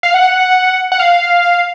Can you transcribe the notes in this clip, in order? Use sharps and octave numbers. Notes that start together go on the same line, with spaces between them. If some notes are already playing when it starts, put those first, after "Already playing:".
F5
F#5
F#5
F5